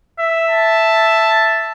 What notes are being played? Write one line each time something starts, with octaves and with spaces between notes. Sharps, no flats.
E5
A5